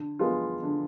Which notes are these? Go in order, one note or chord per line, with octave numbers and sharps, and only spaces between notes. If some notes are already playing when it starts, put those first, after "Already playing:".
Already playing: D3
G#3 B3 F4
D3